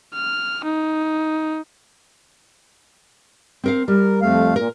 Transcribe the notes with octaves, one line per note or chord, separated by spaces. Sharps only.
F6
D#4
C4 A#4 F5
G3 A#4
F2 A3 F5
A#2 A#4